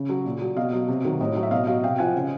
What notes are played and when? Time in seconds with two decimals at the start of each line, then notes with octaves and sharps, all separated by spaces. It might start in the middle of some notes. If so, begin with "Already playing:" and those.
Already playing: C#3
0.09 F#3
0.26 A#2
0.42 F#3
0.56 B2 D#5 F5
0.73 F#3
0.88 C3
1.05 D#3 F#3
1.21 A2 D#5
1.37 F#3
1.43 E5
1.51 B2 D#5 F5
1.67 F#3 D#5 F5
1.84 C3 F5 G5
1.99 F3 F#5 G#5
2.15 C#3